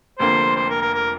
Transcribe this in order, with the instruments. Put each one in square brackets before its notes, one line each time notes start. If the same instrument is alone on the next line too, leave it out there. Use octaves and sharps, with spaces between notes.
[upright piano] F1 F2 D3 A#3 [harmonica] C5
[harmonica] C5
A#4
A#4
A#4